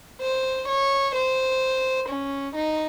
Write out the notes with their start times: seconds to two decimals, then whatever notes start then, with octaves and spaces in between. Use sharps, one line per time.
0.21 C5
0.68 C#5
1.15 C5
2.09 C#4
2.56 D#4